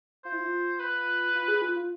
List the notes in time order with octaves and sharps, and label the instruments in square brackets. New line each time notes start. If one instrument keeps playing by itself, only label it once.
[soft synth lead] F4 [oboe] C5
[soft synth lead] E4
F4
[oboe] B4
[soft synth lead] F4
G#4
F4
F4